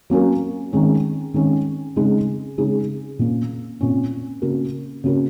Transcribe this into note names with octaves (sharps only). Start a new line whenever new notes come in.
F#3 A#3 C#4 F#4 A#4
D#3 G#3 C#4
D#3 G#3 C#4
C#3 G#3 D#4 G#4
C#3 G#3 D#4 G#4
A#2 A#3 C#4
A#2 A#3 C#4
C#3 A#3 C#4 F#4 A#4
C#3 A#3 C#4 F#4 A#4